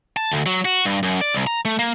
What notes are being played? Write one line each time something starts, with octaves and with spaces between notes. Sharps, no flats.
A5
D2
F#3
F#4
G2
F#2
D5
C2
A#5
A3
A#3